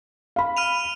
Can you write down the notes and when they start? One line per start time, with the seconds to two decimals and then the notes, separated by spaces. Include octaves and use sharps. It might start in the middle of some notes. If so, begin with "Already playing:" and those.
0.36 F5 B5
0.57 F6 D#7 F7